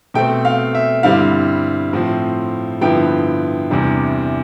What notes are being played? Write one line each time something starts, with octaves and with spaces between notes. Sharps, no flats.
B2 A3 C4 G5
F5
E5
G2 D3 G3 C4 E4 F5
A2 F3 C4
G2 D3 F3 B3 E4 G5
E2 C3 E3 G3 D4